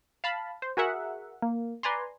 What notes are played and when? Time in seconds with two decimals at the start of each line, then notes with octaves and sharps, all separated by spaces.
0.24 F5 A5 B5
0.62 C5
0.77 F#4 G#4 A#4 E5 F#5
1.42 A#3
1.83 B4 D5 G#5 A#5 C6